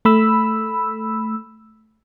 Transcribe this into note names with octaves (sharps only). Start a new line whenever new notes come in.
A3 B5 E6